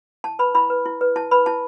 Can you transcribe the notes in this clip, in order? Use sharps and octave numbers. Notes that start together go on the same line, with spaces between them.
E4 A5
B4 B5
E4 B5
B4
E4
B4
E4 A5
B4 B5
E4 A5